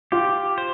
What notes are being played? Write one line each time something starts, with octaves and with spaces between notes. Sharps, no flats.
F4 G4
C5